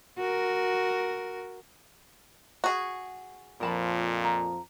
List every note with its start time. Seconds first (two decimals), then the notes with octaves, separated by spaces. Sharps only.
0.18 F#4 A#4
2.64 F#4 G#4
3.61 F2 A#2 F3 A#4 A5 B5
4.24 A#5